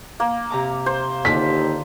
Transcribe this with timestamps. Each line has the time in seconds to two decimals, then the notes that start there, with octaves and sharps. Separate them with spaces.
0.20 A#3
0.50 C3 A#5 D6
0.86 C5
1.25 D#2 D3 F4 B6